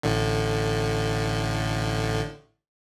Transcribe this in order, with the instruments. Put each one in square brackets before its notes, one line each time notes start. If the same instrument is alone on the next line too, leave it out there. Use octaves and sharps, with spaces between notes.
[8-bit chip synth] A1 A2 D3